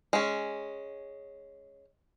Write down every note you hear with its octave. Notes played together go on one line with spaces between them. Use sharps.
G#3 C#4